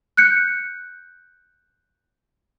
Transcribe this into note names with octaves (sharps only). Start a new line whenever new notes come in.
F#6 G6 C#7